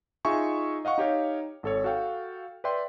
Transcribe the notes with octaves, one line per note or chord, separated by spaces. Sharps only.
D#4 F4 G#4 E5 G#5 C#6
D#5 F5 F#5 C#6
D#4 G4 C#5 F5
G#1 A4 C#5
F#4 A4 F5 G5
B4 D5 E5 G5 C6